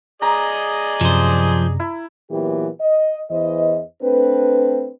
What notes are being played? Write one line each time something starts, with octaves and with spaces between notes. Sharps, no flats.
G#4 D5 D#5 A#5
F#2 C3 F3 C5
E4
A#2 E3 F#3 B3 G4
D#5
E2 E3 C5 D#5
A3 C4 D4 B4